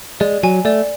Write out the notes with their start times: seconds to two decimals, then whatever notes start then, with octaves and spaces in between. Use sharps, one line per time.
0.20 G#3 D5
0.43 F#3 G#5
0.65 A3 D5